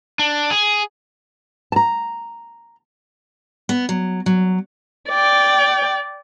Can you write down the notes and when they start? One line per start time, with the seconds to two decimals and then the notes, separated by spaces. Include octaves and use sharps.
0.19 D4
0.51 G#4
1.72 A5 A#5
3.69 B3
3.89 F#3
4.26 F#3
5.09 D5 G5